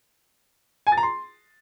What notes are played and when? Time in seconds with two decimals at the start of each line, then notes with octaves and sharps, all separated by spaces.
0.87 G#5
0.92 A6
0.97 A#5
1.03 C6